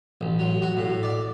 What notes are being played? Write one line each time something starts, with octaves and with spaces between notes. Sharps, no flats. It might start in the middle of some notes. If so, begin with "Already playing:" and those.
A1
F#3
F#4
A2
D5